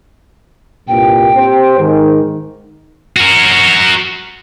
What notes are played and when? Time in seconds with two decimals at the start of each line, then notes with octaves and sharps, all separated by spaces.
0.88 C2 G2 A#2 G5
1.36 C4 G4 C5
1.79 G#2 D#3
3.17 F#4 A#4